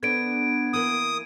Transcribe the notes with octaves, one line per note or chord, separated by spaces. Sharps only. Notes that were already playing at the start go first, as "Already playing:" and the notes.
B3 D4 A4 B4 G#6 D7
E3 A#3 D#6